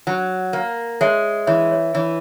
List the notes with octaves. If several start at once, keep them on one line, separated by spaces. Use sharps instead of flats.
F#3
A#3
G#3 C#5 E5
E3 C#5 E5
C#5
E3 C#5